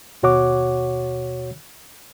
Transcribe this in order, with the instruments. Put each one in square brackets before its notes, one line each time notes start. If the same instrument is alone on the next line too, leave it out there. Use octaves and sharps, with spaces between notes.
[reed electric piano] D#2 B2 F#4 C#5 F#5 D6